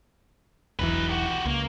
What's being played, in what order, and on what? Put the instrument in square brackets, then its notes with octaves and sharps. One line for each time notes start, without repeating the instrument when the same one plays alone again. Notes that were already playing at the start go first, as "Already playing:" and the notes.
[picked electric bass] E1 B1 E3 [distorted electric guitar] D#4 B4
[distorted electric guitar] F#4 G4
[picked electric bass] C#2 [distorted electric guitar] A#3